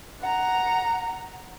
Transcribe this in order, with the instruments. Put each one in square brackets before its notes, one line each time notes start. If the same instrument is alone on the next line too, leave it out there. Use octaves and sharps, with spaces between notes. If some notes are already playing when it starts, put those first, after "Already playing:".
[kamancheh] F#5 A#5